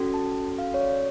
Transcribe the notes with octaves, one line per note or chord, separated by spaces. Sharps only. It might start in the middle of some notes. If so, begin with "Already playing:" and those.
Already playing: C#4 F#4 A4
A5
F5
C#5
D5